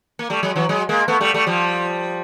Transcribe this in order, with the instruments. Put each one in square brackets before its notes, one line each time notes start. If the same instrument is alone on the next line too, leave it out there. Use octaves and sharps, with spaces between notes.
[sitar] A#3
G3 A3
F#3 G#3
E3 F#3
F#3 G#3
G#3 A#3
A3 B3
G3 A3
G3 A3
F3 G3